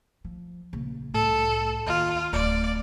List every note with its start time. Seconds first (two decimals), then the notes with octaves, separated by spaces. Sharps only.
0.24 F3
0.73 A#1 C#3
1.14 C2 A2 A4
1.86 D#2 F4
2.33 D1 D5